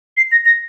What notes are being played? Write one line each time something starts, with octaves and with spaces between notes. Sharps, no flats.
C7
A#6
A#6